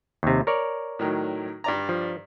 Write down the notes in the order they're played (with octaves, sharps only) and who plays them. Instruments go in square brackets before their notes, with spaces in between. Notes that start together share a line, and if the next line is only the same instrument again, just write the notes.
[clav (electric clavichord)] D#2 C3
A#4 C#5 D5
[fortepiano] A2 D#3 F#3
G2 D5 A#5
[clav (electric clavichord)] F3